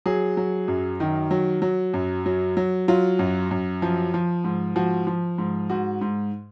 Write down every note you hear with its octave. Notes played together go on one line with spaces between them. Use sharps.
F#3 G#4
F#3
F#2
D#3
F#3
F#3
F#2
F#3
F#3
F#3 F4
F#2
F#2
F3
F3
G#2
F3 F#4
F3
G#2
G#2 F#4
G#2